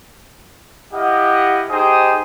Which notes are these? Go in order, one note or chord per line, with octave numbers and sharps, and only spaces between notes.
E4 G4 D#5 F5 F#5
D#4 G4 G#4 C5 G5 D#6